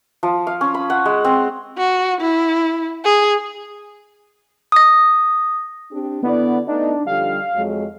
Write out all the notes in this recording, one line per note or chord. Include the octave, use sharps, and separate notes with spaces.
F3
F5
C#4
B5
F#5
G#3
C4
F#4
E4
G#4
D#6 A#6
C4 D4 G4
D3 B3 E4 D5
A3 B3 D4 D#4
D3 F3 G3 F5
F2 F#3 G#3